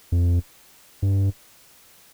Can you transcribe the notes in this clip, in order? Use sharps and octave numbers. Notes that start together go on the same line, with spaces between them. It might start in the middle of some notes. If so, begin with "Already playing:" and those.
F2
G2